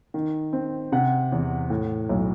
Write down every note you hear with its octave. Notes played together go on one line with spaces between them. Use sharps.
D#3
C4
C3 F#5
E2
A2
B1